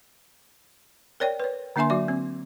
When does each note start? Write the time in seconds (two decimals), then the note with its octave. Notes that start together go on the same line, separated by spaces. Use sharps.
1.20 A#4 C#5 D5 G5
1.40 B4 C#5
1.76 D3 A#3 D4 E5 G#5 C6
1.90 F#3 F#4 D5 E5
2.08 C4